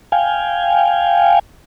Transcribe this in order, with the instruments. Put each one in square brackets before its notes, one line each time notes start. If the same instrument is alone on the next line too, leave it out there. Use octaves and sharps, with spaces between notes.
[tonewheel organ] F5 G5 G#5